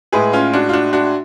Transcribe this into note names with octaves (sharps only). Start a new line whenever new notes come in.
A2 G#3 G#4 B4
C#4 F4
D4 F#4
F4
D4 F#4
D4 F#4